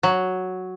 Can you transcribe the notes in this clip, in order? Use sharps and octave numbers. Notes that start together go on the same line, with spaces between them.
F#3